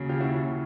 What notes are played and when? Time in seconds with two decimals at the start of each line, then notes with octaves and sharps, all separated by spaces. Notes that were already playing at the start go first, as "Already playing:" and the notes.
Already playing: D#2 C#3 F#3
0.09 F4 G4
0.20 E4 F#4